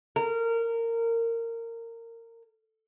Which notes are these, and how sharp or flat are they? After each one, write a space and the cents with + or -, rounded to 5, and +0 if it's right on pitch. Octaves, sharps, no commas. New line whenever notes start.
A#4 -20